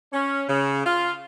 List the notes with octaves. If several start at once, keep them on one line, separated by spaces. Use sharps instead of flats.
C#4
C#3
F4